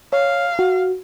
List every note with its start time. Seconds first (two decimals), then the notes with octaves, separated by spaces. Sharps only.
0.13 C#5 F5
0.59 F#4